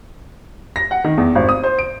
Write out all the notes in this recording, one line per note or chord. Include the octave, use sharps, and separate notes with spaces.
A#6
F#5
D#3
E2
G#1
D#6
C5
D7